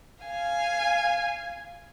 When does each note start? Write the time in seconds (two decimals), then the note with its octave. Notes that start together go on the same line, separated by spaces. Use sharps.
0.24 F5 G#5